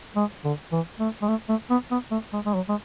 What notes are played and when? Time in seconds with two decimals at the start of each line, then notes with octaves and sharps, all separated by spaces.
0.16 G#3
0.44 D3
0.72 E3
1.00 A3
1.22 G#3
1.28 A3
1.49 A3
1.70 B3
1.91 B3
2.11 A3
2.33 G#3
2.46 G#3
2.54 F#3
2.69 G#3